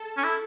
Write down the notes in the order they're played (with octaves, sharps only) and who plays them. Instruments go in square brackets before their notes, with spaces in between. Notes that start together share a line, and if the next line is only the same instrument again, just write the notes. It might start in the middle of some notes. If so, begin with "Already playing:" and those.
Already playing: [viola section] A4
[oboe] C#4
E4